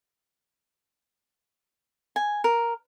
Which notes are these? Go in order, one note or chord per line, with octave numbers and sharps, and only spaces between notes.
G#5
A#4